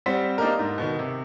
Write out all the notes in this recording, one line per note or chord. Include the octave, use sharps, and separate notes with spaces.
G3 C4 C5 F#5 B6
A#3 D4 D#4 G4 A#4
G#2
B2 D#3
C3